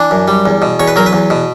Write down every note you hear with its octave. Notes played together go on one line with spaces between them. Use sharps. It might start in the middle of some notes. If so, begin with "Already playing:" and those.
Already playing: E3 D4
F#2
G3
E2
B2
E2 C#5
B4
F#3 A#4
B4
E2
B2